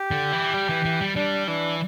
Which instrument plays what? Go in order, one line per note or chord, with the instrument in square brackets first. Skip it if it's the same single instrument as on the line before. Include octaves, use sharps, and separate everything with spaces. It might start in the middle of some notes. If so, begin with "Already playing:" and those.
Already playing: [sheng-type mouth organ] G4
[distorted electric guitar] D3
E3
G3
E3
E3
G3
[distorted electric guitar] G3 [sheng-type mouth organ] D4
[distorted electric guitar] E3 [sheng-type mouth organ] D4